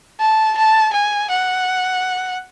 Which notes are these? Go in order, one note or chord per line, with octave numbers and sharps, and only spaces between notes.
A5
A5
G#5
F#5